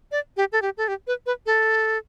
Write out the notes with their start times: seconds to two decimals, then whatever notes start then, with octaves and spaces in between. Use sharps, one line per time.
0.12 D5
0.37 G4
0.52 A4
0.62 G4
0.77 A4
0.88 G4
1.07 B4
1.26 B4
1.46 A4